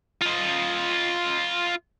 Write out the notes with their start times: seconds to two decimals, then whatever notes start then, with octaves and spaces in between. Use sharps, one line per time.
0.22 F4 D#5